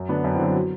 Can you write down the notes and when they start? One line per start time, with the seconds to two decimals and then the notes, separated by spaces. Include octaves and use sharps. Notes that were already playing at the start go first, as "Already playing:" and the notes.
Already playing: F#2
0.09 D3 B3 D4
0.24 F#2
0.34 C4 E4
0.39 D3 F#3
0.55 F#3